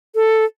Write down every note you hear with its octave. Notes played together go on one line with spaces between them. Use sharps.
A4